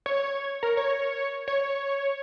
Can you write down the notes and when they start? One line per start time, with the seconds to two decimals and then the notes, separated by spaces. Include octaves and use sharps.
0.06 C#5
0.63 A#4
0.77 C#5
1.48 C#5